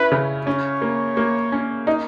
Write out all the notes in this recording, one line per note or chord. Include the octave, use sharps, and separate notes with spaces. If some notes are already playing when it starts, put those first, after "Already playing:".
Already playing: C#4 E4 B4
C#3
C#4 C#5
A#3
A#3
C#4
D#4